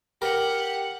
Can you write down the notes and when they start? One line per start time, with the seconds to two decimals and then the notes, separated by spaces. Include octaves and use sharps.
0.22 G4 A#4 F#5